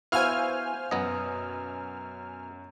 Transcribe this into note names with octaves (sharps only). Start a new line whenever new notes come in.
B3 E4 F#4 C5 F5 G#5 F6
F#2 B2 B3 D#5